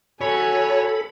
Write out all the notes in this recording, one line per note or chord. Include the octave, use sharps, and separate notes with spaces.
F#4 A4 C#5 G#5 B5